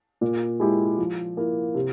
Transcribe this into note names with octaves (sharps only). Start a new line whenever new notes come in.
A#2
G#3 E4 G4
F3
A#3 E4
C3